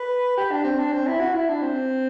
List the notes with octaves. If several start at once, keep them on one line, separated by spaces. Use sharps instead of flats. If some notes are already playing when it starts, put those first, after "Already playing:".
Already playing: B4
G4
D4
C4
D4
C4
E4
F#4
E4
D4
C4